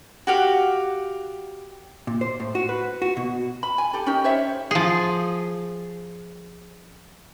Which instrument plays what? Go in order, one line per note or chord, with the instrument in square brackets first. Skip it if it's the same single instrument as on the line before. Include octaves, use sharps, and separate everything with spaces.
[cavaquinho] F#4 G4 F5
[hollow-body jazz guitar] A#2
C5
A2
F#4
B4
F#4
B2
[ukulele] B5
G#5
G4 A4
C#4 D#4 G4 A#4
C5 C#5 E5
[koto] F3 G#4